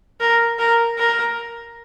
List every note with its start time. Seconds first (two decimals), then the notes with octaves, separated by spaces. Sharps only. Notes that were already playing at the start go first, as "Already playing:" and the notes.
0.20 A#4
0.59 A#4
0.98 A#4